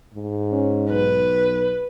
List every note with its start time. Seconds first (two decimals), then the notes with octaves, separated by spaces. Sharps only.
0.14 G#2
0.52 C#4
0.89 B1 B4